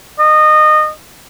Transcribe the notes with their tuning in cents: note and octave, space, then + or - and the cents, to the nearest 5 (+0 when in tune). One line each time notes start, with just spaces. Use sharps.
D#5 -25